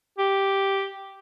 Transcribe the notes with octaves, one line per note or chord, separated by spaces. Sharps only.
G4